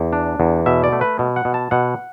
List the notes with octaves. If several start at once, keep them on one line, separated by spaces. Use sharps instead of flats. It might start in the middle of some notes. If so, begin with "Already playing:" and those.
Already playing: E2
D4
E2
B2 E5
D5
A3
B4
B2
F#5
B2
A5
B2 F#5